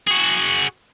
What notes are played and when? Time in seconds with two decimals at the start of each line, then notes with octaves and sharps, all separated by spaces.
0.07 F#4 G#4